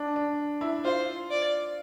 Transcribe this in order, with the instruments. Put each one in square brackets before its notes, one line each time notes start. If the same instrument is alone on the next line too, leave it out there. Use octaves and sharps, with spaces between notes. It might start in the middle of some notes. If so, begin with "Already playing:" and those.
Already playing: [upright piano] D4
D4
E4
[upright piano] F4 [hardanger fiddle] C5
[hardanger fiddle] D5